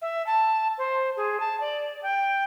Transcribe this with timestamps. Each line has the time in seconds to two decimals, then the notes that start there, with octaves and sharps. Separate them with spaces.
0.02 E5
0.27 A5
0.78 C5
1.17 G#4
1.40 A5
1.60 D5
2.03 G5